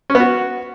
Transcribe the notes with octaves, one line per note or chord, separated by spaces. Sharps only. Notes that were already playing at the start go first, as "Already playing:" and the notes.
C#4
B3
F#4